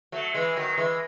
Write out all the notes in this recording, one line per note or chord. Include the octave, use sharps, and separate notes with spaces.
F#3 A3
E3 G#3
D#3 F#3
E3 G#3